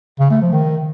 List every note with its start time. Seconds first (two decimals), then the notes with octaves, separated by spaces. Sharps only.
0.20 C#3
0.31 A3
0.41 F3
0.52 D#3